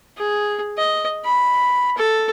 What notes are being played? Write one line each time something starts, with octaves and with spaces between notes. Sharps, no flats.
G#4
D#5
B5
A4